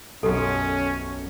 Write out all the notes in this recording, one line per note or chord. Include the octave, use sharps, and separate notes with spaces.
B1 F#2 C#4 G4 A4